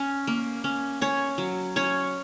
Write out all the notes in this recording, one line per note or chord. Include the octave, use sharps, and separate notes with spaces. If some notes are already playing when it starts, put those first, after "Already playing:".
Already playing: C#4
A#3
C#4
C#4 C#5
F#3
C#4 C#5